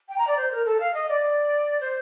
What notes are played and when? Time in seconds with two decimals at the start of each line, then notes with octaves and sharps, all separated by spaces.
0.09 G5
0.18 A#5
0.27 D5
0.37 C5
0.51 A#4
0.65 A4
0.80 F5
0.94 D#5
1.09 D5
1.81 C5